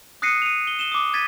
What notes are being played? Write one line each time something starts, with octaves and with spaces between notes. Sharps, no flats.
D#6 F#6 A#6 C7 C#7 D#7
D#7 F7
G7
E7 G7
D6 D#6
G#6 A6 B6 D#7